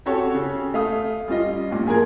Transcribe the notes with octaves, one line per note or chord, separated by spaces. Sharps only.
C4 C#4 F#4 G4 A4 C#5
C#3
A3 F5 D#6
G3 C#4 F4 D#5
G2 A#2
F3 G#4 A#4 G#6